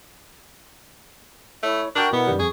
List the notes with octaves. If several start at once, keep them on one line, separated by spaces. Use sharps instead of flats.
A3 E4 C#5
D4 F#4 A#4 G5 C#6
B2 B3 E4 A#4 F#5
F#2 D#3 G3
F2 G#4 C#6